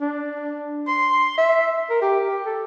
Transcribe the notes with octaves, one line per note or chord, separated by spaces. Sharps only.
D4
C6
E5
A#4
G4
A4